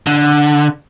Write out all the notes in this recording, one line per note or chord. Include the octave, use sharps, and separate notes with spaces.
D3